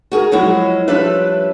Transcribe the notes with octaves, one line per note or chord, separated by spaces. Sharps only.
F#4 G#4 A#4
F3 F#3 G#3 C#4 E4 F#4
F3 G3 C#4 D4 B4 E5